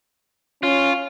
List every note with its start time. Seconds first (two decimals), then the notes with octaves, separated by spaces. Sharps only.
0.63 C#4 F4